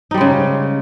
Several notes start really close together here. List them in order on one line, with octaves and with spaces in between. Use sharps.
D#4 G3 G#3 C#3